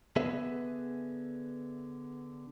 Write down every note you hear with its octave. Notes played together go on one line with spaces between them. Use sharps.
D3 B3 G#4 B4 E5